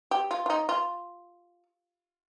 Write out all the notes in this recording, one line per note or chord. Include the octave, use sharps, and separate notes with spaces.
G4
F4
F4
D#4
F4